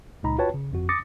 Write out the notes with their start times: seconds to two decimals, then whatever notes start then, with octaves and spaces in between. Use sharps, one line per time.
0.23 C#2 A#2 D#4 A#5 B5
0.38 F4 F#4 B4 C#5 G5 A5
0.54 C#3
0.71 G1 F2 F#4
0.89 D6 D#6 A6 A#6 C#7